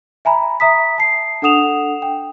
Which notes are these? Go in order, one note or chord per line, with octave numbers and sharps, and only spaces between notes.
E5 G#5 A#5 B5
E5 A#5 D#6 B6
A5 C7
D4 A4 F#5 D#6 E7 F7
G5